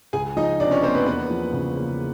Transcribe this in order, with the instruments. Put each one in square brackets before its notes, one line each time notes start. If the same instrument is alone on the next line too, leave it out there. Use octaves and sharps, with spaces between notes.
[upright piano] C#2 [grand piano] G#4 G#5
[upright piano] F3 [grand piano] D#4 D#5
[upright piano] C3 [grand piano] D4 D5
[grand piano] C#4 C#5
[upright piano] A#3 [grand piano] C4 C5
[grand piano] B3 B4
[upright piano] E2 [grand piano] B3 B4
[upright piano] F3
C#3
A#3